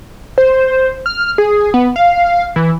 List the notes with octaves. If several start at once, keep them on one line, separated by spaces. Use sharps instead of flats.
C5
F6
G#4
B3
F5
E3